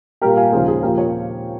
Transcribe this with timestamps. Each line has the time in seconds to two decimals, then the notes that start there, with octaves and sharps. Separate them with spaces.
0.22 A#2 G3 A#3 G4 A#4
0.37 F5 G#5
0.52 D#2 C#3 F3 G#3 G#4 C5
0.68 G#4
0.83 A#2 F3 A#3 G4 A#4
0.98 A#4 C#5